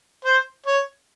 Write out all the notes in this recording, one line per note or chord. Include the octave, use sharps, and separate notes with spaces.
C5
C#5